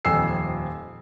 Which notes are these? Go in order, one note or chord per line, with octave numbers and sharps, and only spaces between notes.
D#1 F2 G#5 E6 C7